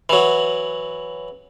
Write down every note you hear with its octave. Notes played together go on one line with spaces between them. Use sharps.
E3 F#3